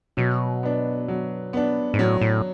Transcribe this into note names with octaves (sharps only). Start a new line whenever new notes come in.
B2 F#3
B3 D4
F#3
B3 D4
G#2
A2 F#3
A2